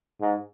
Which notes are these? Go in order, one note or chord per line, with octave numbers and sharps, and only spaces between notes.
G#2